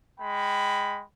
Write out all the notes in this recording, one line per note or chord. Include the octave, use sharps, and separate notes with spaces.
G#3 G5 B5